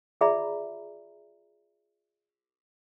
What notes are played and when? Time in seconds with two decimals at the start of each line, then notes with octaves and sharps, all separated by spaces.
0.21 F4 G#4 D5 E5 A#5 B5